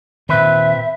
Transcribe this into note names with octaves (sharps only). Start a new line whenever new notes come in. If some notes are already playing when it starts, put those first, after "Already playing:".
A#2 D#3 C4 B4 E5